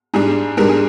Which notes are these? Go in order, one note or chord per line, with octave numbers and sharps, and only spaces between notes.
G#2 G3 D4 G#4
G#2 G3 D4 A#4
G#4